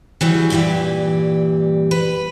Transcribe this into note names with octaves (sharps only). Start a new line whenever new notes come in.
E3 F#3 G3
G2 A#2 E3 G3 G4
B4